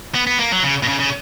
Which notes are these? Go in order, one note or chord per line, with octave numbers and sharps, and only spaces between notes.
B3
B3
A#3
F#3
C#3
B2
C#3
C#3